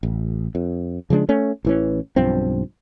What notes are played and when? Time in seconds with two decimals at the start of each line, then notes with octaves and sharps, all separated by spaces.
0.03 A1
0.55 F2
1.10 C#3 F3 G#3 D4
1.29 A3 C#4
1.65 A1 E3 C#4
2.16 B1 G2 F3 C4